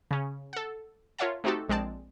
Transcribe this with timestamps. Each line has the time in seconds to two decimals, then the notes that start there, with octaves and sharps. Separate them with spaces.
0.11 C#3 C#4
0.53 A4 F#5
1.18 F4 A#4 C#5 E5 F#5 A5
1.44 A3 C4 D#4 F#4 G4 A4
1.68 A#1 G#3 C4 D5 A5